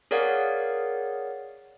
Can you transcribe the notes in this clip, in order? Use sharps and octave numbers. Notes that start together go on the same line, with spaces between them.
G#4 A#4 C#5 D5 F5 F#5